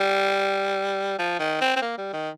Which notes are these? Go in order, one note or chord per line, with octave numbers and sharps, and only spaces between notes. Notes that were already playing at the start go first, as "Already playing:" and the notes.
Already playing: G3
F3
D#3
C4
C4
A#3
G3
D#3